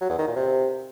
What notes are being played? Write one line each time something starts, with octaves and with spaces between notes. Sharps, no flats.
F#3
E2
D#3
A#2
C3